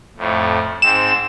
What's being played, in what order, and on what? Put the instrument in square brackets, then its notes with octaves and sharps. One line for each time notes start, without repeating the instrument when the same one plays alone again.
[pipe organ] F2 A2
[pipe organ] G#2 C4 [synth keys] E7